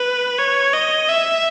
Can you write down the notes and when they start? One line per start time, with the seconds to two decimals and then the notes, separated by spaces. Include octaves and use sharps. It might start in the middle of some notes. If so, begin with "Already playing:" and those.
Already playing: B4
0.38 C#5
0.73 D#5
1.08 E5